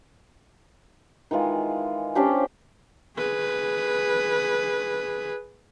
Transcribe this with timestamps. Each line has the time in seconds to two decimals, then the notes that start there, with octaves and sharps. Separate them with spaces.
1.31 D#3 E3 G#3 F4
2.15 C#4 D4 G4 C5
3.17 G#4 B4